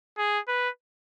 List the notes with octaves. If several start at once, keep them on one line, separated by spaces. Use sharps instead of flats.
G#4
B4